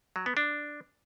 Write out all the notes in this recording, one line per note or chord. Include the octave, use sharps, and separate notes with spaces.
F#3
B3
D4